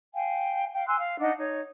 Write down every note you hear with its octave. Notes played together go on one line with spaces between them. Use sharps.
F5 G5 G#5
F5 G5
G#5 C6 E6 F#6
F5
D4 D#4 D#5 F#5
D#4 C#5